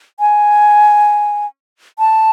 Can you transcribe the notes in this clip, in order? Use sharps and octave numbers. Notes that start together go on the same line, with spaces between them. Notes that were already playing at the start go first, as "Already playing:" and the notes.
G#5
A5